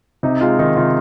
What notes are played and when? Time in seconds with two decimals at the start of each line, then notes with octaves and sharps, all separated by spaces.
0.23 C3 D#4
0.41 G#3 F4
0.59 D#3 D#4
0.77 C3 F4